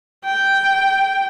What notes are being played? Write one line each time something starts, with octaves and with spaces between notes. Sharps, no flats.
G5